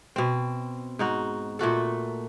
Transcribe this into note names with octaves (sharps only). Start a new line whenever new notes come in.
B2 C4
G#2 D#4 F#4
A#2 A3 F#4 A4